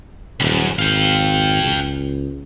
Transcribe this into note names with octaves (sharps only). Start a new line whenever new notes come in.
D#1 C#2 F#2
G#1 F5 G5
C#2